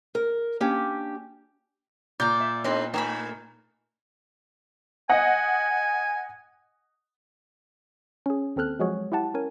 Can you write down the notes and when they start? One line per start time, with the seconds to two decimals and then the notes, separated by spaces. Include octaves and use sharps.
0.15 A#4
0.60 A#3 C#4 D4 G4
2.20 A#2 D5 A#5 G6
2.40 E5
2.64 B3 D#4 A4 B4 C6
2.94 A3 D#4 G#5 B5
5.10 D#5 F#5 G#5
8.26 C#4 G#4
8.56 D#2 C4 A4 F6 F#6
8.79 F3 F#3 G#3 F#4 G#4 C#5
9.12 E4 G4 F#5 A5
9.34 C#4 A#4 G#5